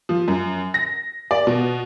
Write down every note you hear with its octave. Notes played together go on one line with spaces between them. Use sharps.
F3
F#2
A#6
D5
B2